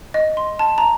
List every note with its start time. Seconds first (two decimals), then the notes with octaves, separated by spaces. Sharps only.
0.14 D#5
0.37 C6
0.59 A5
0.78 A#5